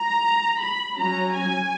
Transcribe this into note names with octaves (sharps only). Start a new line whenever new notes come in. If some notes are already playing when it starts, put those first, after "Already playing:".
Already playing: A#5
B5
F#3 C#4 A#5
G#5